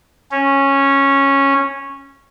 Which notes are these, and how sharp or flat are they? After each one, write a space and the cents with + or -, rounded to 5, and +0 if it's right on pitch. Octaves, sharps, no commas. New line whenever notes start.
C#4 -10